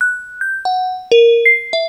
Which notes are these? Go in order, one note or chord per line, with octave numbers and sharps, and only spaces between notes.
F#6
G6
F#5
A#4
C7
E5